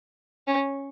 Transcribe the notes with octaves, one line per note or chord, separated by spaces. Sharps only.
C#4